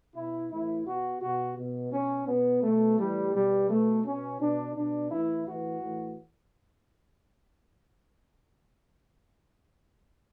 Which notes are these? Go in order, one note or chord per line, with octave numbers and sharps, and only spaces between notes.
B2 E4
A2 E3 E4
B2 F#4
B2 F#4
B2
B2 C#4
B2 B3
B2 A3
A2 E3 G3
B2 G3
B2 A3
B2 C#4
B2 D4
B2 D4
A2 E3 E4
A2 E3 F#4
A2 E3